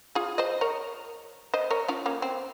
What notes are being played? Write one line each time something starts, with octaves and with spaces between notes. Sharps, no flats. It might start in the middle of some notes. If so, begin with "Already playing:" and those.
F4 G#4
C5 D#5
A#4 C#5
C5 D#5
A#4 C#5
C#4 F4
A#3 C#4
C4